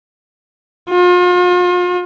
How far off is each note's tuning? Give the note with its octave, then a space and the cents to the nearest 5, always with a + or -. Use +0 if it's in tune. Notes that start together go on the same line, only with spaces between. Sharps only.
F4 +40